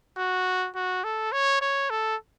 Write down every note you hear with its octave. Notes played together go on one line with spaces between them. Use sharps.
F#4
F#4
A4
C#5
C#5
A4